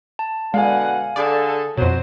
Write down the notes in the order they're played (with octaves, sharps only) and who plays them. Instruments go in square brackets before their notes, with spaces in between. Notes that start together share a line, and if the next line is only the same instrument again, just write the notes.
[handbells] A5
[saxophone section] B2 D3 F#5 [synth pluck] G#3 [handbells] F5 G#5
[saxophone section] D3 G#4 A4 [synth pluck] D5
[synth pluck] F2 B2 [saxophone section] F#3 C5